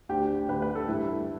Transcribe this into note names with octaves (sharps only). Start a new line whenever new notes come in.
D2 D3 G4
D2 D3 B4
B4
A4
G2 E3 E4